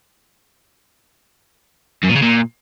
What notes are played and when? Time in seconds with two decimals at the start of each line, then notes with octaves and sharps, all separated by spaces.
2.03 F#2
2.09 A#2
2.16 C#3
2.22 A#2